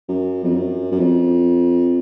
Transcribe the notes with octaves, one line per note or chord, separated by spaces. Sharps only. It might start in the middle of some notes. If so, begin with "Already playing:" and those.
F#2
F2
F#2
F#2
F2